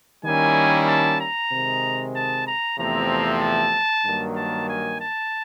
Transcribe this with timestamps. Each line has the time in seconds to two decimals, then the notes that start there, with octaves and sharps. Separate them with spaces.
0.25 D#3 G3 A#3 C#4 E4 G#5
0.88 A5
1.20 A#5
1.51 C3 D#3 G#3
2.15 A5
2.47 A#5
2.78 E2 C3 F3 A3 C4 A#5
3.41 A5
4.05 G2 D#3 F#3 A#3
4.37 A5
4.69 G#5
5.00 A5